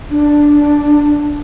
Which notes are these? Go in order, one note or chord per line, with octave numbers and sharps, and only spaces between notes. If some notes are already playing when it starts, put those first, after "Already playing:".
D4